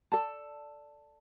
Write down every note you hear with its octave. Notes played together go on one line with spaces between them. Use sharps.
A4 D5 A5